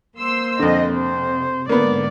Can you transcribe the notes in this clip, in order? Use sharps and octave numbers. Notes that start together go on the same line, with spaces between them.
A#3 C5 C6 E6
F2 D3 D#5
C3 C5
G#2 D3 A#3 B3 D5